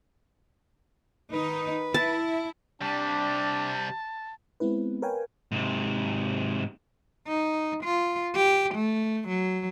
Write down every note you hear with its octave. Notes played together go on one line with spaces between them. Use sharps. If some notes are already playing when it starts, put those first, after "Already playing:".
D#3 D#4 B4
E4 A5
C3 G3 D4 A5
G#3 B3 C4 E4 B4
A#4 B4 C#5 F5 G5 G#5
G#2 C3
D#4
F4
G4
A3
F#3